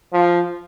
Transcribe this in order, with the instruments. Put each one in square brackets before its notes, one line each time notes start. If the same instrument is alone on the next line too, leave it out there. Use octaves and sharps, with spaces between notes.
[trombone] F3